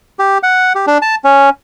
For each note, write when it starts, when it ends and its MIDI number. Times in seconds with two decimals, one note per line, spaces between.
0.19 0.38 67
0.43 0.73 78
0.75 0.86 67
0.87 0.98 62
1.02 1.15 81
1.24 1.50 61